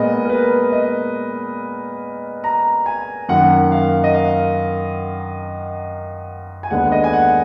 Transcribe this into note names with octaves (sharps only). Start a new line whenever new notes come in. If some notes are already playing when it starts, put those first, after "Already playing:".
Already playing: A#2 G#3 B3 D#5
A#4
B4
D#5
A#5
G#5
F#2 D#3 A#3 F#5
F5
D#5
F5
G#5
D#2 D3 G#3 B3 F#5
D#5
G#5
F#5